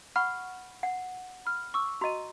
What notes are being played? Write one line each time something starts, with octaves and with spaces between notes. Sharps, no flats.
F#5 B5 C#6 F6
F#5
B5 F6
C#6 D6 E6
F#4 D#5 A#5 D#7